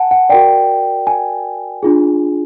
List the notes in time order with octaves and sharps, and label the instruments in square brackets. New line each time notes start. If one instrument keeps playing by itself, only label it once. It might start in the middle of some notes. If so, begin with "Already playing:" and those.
Already playing: [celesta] F#5 G#5 A5
F#5
F#4 A#4 D5 G5
G#5
D4 F4 G#4